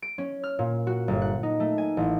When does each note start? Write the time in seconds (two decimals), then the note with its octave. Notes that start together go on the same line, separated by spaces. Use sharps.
0.02 D7
0.18 C#4
0.44 F6
0.59 A#2
0.87 F#4
1.08 G1
1.22 F#5
1.43 D#4
1.60 A3
1.78 G#5
1.97 A1